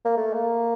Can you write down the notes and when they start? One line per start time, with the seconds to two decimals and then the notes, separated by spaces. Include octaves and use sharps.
0.05 A#3
0.17 A3
0.33 A#3